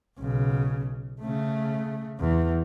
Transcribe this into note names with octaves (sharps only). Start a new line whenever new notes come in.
B1 C#3
C#3 A3
E2